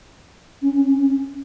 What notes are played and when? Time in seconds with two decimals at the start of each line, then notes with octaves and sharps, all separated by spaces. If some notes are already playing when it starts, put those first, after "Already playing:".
0.62 C#4
0.87 C#4